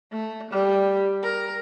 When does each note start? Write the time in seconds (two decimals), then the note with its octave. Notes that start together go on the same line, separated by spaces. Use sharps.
0.12 A3
0.51 G3
1.23 A#4